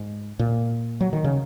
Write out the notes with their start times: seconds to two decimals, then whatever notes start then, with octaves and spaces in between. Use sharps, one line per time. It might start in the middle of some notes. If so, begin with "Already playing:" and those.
Already playing: G#2
0.39 A#2
1.01 F#3
1.13 D#3
1.24 C#3